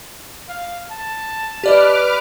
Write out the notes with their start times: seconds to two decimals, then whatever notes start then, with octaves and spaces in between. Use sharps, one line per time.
0.49 F5
0.91 A5
1.64 G4 B4 D5 D#5 D6 F6